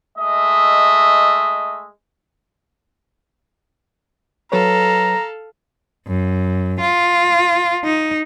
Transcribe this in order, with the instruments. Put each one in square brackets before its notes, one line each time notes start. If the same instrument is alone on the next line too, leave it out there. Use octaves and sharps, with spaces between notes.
[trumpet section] G#3 A3 D#5 E5
[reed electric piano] F#3 B4 C#5 [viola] A4 F5 [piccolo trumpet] A#5
[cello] F#2
F4
D#4